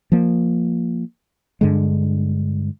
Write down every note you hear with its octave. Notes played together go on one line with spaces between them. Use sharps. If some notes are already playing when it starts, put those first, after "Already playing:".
F3 A#3
G2 D3 G#3